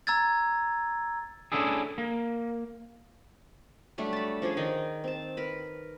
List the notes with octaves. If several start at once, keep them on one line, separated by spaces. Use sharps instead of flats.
A#5 E6 G#6 A6
A3 A#3 C#4 D4 E4 G#4
A#3
F#3 G3 A3 D4
A5 B5
F3 C#4 D4 G#4
D#3 D#4 D5 D#5
C4 A5
A#4 B4